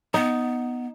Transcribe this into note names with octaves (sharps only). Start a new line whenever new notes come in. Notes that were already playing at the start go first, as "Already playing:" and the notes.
B3 D#4